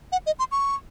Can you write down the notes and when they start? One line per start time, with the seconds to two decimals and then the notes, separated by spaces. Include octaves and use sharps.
0.12 F#5
0.26 D#5
0.39 C6
0.52 C#6